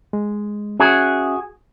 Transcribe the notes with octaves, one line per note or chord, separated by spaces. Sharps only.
G#3
C#4 F#4 G#4 E5